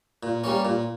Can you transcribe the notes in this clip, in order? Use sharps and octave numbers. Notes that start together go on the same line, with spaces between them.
A#2
G3 A#3 C#4
A#2